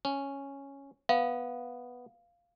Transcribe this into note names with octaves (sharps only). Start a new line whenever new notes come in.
C#4
B3 F5